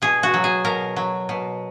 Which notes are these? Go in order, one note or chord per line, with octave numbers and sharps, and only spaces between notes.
B2 G#4
F#4
F#3
G#4
B2 A#4
F#3
B2